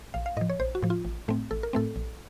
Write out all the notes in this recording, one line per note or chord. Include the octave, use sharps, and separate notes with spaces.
A#1 F5
F5
A2 F3 D#5
C#5
A#1 C5
F#4
A2 F3
F4
A1
A2 A3 C4
A1 A4
A#4
A2 A3 C4 A4
A#1